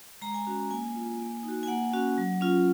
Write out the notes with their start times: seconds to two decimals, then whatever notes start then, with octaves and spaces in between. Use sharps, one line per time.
0.22 G#3 A#5
0.34 G#5
0.46 C#4 F#4
0.71 A#3 G#5
0.95 F4
1.20 A#3
1.43 D#4
1.48 F#4
1.63 G#5
1.68 A#3 F#5
1.93 C#4 F#4
2.18 F#3
2.41 C#4 F4